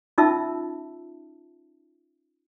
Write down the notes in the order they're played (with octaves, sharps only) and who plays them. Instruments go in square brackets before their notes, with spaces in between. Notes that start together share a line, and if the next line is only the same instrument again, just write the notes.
[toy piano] C#4 D#4 F4 E5 A5 E6